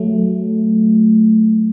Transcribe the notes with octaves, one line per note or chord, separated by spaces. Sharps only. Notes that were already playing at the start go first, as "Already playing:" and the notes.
Already playing: F#3 A3